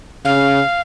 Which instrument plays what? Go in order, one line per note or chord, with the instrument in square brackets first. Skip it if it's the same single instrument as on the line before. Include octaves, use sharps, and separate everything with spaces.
[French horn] C#3 [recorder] F5